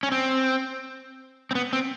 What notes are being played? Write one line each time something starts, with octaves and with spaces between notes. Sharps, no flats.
C#4
C4
C4
B3
C4